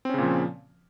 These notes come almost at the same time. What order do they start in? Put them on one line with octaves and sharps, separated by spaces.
C4 C#4 C#3 A#2 F3